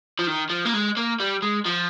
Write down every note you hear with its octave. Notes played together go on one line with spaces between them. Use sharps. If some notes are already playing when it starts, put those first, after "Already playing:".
F3
D#3
F3
A#3
G#3
A#3
G3
G#3
F3